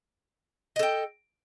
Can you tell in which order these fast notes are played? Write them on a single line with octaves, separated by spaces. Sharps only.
D#5 A4 G5